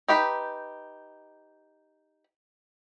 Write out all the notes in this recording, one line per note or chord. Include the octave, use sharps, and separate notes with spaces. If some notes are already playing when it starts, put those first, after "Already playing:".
D#4 G4 B4